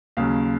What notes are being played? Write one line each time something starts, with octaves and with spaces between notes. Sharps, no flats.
D#2 C#3 F#3 F5